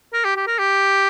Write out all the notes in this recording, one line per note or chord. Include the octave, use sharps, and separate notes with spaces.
A#4
G4
G4
A#4
G4